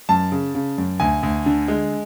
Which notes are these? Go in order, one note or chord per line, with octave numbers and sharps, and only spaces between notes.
F#2 A5
C#3
C#3
F#2
D2 G#5
D2
D3
G#3